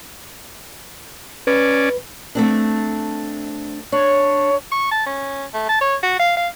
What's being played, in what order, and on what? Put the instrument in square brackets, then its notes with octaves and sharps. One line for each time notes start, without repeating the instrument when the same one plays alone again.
[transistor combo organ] C#4 D5 [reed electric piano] B4
[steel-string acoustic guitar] A3 C4 D4
[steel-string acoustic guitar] D4 [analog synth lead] C#5
[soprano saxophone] C#6
A5
C#4
A3
A5
C#5
F#4
F5
F5